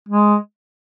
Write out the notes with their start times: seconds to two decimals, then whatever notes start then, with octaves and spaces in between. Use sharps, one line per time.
0.09 G#3